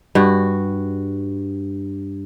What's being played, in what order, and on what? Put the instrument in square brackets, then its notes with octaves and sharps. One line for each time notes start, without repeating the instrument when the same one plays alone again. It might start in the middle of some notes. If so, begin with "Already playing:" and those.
[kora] G2 F#4